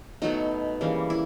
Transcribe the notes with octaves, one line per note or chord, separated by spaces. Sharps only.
B2 F#3 A3 D#4
C#3 E3 G3 A#3
E4